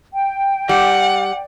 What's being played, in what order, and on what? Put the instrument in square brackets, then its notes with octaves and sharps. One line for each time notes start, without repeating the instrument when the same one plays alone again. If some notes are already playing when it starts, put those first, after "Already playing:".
[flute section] G5
[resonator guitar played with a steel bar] G3 [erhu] F#5